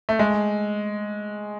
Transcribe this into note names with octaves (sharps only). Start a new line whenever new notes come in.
A3
G#3